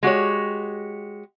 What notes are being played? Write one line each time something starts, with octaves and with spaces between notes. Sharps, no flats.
G#3 F#4 G4 C#5